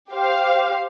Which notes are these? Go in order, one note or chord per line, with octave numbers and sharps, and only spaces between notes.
G4 C5 F5